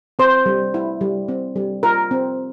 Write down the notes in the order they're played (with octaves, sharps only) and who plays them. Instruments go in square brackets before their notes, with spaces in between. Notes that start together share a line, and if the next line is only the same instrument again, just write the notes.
[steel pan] C4 C5
G3
E4
G3
C4
G3
F4 A#4
C4